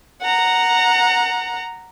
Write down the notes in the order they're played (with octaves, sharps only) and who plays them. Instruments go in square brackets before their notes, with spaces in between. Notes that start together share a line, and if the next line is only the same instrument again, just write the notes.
[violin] F#5 A#5